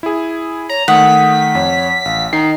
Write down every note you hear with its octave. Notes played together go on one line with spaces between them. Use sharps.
E4 G#4
C#5 A#5
D#3 A3 F#5 D#6 B6
F2 C#5
A1 F5
D#3 A#5 C7